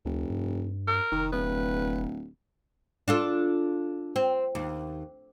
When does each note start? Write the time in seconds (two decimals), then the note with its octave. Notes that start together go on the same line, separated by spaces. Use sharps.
0.05 F1 D2
0.30 G2
0.87 A#4
1.12 F1 D#3
1.32 D1 B4
3.08 D4 F4 A4
4.16 C4
4.55 D#2